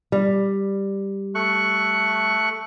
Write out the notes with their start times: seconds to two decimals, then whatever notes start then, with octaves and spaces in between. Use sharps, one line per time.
0.12 G3
1.35 A3 C#6 F#6